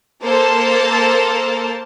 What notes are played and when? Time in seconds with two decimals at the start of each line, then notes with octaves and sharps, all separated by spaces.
0.23 A#3 A4 C5 A5